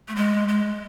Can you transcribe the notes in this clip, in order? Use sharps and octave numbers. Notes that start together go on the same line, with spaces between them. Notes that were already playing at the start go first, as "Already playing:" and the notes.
A3
G#3
G#3